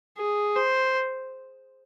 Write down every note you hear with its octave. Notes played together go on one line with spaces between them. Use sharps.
G#4
C5